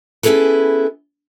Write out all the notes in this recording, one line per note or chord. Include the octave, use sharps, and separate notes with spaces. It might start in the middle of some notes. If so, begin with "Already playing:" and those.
B3 C#4 E4 G#4 A4 B4